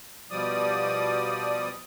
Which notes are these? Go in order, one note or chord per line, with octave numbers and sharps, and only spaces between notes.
B2 F3 G3 D5 D#6